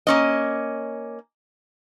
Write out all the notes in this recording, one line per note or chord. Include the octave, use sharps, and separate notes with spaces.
A#3 C#4 D#5